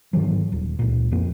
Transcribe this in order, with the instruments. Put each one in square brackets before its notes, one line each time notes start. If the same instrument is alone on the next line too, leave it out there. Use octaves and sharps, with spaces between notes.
[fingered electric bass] G#2 D#3 E3 F#3
D#1
C#2 A#2
F2 F3 A#3